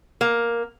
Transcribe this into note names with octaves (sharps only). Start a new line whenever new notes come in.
A#3